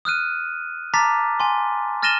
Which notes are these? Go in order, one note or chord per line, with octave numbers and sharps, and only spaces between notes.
D#6 F6 F#6 D#7
A5 A#5 D6 F6 A6 B6
G#5 C6
F6 A6 A#6 D#7 E7 G7